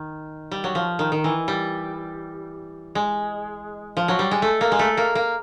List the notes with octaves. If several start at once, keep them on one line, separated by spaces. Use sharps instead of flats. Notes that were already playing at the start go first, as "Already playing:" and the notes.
Already playing: D#3
G3
F#3
F3
D#3
D#3
E3
G3
G#3
F3
F#3
G3
G#3
A3
A#3
G#3
A3
A#3
A#3